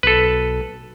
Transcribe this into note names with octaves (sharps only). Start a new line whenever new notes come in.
B1 A4 B4